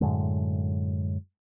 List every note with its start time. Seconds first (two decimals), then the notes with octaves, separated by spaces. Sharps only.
0.01 F#2 A2 D3 G#3